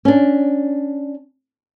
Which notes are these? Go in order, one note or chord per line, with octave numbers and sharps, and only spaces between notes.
C#4 D4